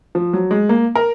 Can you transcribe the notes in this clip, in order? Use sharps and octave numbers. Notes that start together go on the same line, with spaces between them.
F3
F#3
G#3
A#3
A#4